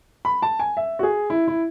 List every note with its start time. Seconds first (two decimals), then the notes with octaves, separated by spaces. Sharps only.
0.25 B5
0.42 A5
0.60 G#5
0.77 E5
0.99 F#4
1.03 G#4
1.30 E4
1.48 E4